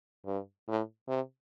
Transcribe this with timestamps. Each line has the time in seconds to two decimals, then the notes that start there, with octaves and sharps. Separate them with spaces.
0.26 G2
0.68 A2
1.08 C3